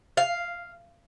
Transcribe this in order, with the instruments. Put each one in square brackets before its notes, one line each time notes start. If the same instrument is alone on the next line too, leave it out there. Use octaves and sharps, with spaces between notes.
[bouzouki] F5